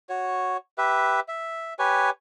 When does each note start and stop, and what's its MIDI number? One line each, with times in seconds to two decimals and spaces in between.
0.09 0.57 66
0.09 0.57 73
0.78 1.20 67
0.78 1.20 71
0.78 1.20 76
1.28 1.74 76
1.79 2.10 67
1.79 2.10 71
1.79 2.10 73
1.79 2.10 80